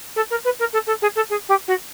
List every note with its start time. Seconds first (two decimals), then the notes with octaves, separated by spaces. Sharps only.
0.16 A4
0.31 A#4
0.45 B4
0.59 A#4
0.73 A4
0.87 A4
1.02 G#4
1.16 A4
1.30 G#4
1.49 G4
1.68 F#4